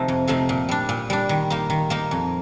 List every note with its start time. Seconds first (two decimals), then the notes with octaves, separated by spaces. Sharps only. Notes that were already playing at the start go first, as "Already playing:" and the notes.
Already playing: C3 F3 A3 D#4
0.08 F2
0.28 C3 F3 A3 D#4
0.49 A#2
0.69 G3 D4
0.89 A#2
1.10 G3 D4
1.29 D#3
1.50 A#3 D#4
1.70 D#3
1.90 A#3 D#4
2.11 F2